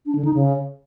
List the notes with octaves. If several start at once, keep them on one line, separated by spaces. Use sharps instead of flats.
D4
D3
D#4
C#3